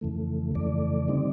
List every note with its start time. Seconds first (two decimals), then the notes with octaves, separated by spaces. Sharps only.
0.01 F2 C#3 E3 A3
0.55 F2 C#3 E3 A3 D5
1.08 D3 G3 C4 D#4